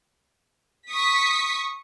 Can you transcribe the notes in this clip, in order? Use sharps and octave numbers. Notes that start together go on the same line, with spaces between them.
C#6 D#6 B6